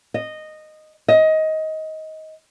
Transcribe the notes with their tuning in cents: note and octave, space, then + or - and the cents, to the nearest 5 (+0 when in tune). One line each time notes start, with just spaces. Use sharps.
D#5 -10
D#5 +20